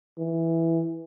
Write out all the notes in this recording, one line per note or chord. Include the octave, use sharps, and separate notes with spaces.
E3